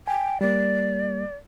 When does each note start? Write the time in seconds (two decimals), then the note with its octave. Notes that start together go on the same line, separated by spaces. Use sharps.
0.07 G5 G#5
0.41 G3 A#3 D5